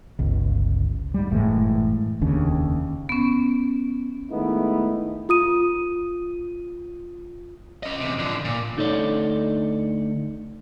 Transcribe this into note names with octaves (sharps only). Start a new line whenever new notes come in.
G1 C#2
G#2 G3
F#1 A2 E3 G#3
F1 D#2 C#3 D4
B3 C#4
D#3 G#3 A3 B3 D#4 E4
F4 D#6 D#7
C#4 D#5
E2 C3
D3 F3
A#2
D2 D#4 A4 C#5 D5